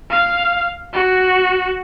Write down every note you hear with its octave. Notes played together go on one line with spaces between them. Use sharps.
F5
F#4